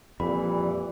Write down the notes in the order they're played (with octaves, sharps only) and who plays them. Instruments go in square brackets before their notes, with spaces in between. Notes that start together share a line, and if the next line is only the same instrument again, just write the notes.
[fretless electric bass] F2 [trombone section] A#2 E3 G3 [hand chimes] B5